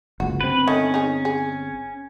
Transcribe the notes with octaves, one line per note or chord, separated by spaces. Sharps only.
F#1 C#2 F#4
G1 C4 B4
D#3 A3 C#4
D#4 G#4
G#4